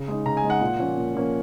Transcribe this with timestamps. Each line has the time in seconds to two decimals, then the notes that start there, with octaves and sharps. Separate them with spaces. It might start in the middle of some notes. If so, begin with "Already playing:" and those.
Already playing: C#3
0.08 G#3 D#4
0.25 C#3 A#5
0.37 G#5
0.43 G#3 D#4
0.50 F#5
0.61 A#2
0.79 F3 A#3 C#4
0.97 A#2
1.15 F3 A#3 C#4